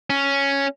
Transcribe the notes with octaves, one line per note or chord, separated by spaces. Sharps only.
C#4